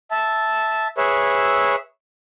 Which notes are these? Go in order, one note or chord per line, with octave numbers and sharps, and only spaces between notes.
E5 A5
G#4 B4 C#5 E5 E6